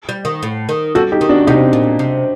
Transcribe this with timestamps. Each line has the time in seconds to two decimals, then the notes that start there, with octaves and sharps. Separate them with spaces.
0.09 G3
0.25 D#3
0.43 A2
0.69 D#3
0.95 G3 F#4 A4
1.12 D#4 G4
1.21 D#3
1.29 D4 F#4
1.47 C3 D#4 G4
1.73 A#2
1.99 C3